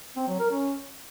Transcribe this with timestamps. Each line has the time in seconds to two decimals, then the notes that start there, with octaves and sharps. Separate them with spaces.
0.16 C4
0.28 F#3
0.40 A#4
0.51 C#4